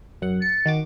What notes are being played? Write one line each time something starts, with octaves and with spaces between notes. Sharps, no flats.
F#2 F#5
A6 C#7
D#3 F#4 D6